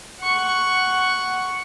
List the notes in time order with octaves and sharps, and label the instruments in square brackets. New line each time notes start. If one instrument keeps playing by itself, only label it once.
[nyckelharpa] F#5 C#6